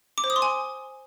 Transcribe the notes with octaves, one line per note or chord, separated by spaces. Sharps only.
D6
C5
D#6
C6
G#5